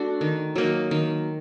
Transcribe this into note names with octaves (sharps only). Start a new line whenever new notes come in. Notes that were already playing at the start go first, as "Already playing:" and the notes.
Already playing: A3 D4 F#4
D#3
F#3 A#3 D#4
D#3